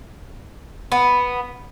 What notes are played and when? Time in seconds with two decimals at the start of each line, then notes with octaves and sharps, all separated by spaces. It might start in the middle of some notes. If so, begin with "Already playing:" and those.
0.92 B3